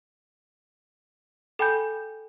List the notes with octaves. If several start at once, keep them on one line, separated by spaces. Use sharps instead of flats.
A4 G5 G#5 B5 G6